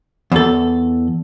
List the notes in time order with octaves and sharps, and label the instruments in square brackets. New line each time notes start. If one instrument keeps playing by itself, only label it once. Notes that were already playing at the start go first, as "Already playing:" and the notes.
[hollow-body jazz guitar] E2 A4